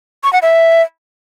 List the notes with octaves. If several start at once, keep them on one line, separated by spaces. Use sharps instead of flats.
C#6
F#5
E5